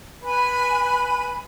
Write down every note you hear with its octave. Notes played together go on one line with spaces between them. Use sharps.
B4 G#5 B5